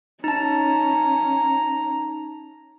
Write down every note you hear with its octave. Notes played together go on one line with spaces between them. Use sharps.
C#4 D#4 A5 A#5